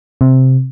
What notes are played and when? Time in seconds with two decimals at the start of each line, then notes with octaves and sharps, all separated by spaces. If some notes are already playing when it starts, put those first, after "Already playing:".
0.21 C3